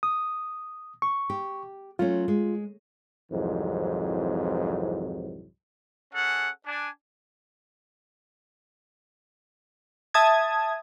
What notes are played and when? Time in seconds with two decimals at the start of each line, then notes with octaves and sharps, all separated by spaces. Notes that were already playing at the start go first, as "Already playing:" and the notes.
0.03 D#6
1.02 C#6
1.30 G4
1.99 F#3 A3 C#4 F4
2.28 G#3
3.31 C2 F2 G#2 E3 F#3
6.13 C#4 G#4 A4 F#5
6.66 D4 G#5
10.14 E5 A5 D#6 G#6